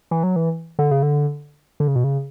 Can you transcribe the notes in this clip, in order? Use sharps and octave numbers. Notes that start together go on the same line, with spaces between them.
E3
F#3
E3
D3
C#3
D3
D3
C#3
B2
C#3